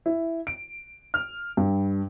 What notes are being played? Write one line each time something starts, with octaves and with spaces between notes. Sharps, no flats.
E4
D7
F6
G2